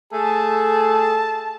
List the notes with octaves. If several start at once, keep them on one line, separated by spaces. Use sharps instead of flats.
A3 G#4 A5